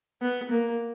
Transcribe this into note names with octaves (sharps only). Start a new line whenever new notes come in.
B3
A#3